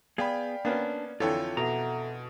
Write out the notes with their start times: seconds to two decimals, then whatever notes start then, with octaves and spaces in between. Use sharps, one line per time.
0.18 B3 G#4 D5 F5 G5 B5
0.65 A#3 B3 C#4 D4
1.20 F2 D3 E3 F4 A4 C#5 G5
1.57 B2 A4 E5 F#5 A#5